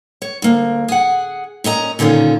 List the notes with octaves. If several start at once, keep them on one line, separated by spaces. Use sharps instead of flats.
C#5
D2 A#3
G#4 F#5
A#2 C#4 D#5 A#5
A#2 D3 D#3 C#4 F4